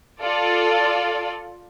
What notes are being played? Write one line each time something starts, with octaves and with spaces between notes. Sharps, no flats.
F4 A4 D5